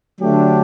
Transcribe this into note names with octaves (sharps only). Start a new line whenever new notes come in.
D3 F#3 A3 D4 G4